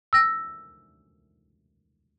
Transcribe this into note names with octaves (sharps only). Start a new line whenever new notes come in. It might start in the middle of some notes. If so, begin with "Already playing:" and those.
E6 A#6